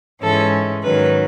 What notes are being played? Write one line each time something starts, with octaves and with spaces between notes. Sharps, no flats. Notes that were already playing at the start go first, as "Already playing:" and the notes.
G#2 E3 G#3 C#4 A4
G#2 D#3 F#3 C#4 B4